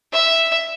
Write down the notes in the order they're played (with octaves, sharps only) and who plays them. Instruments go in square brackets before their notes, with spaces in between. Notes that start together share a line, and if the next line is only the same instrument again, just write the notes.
[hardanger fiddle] E5